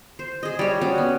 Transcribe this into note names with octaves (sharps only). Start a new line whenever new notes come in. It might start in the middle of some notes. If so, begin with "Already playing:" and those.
C5
G#4 D#5
G3 C#5
C#4 F#4
B3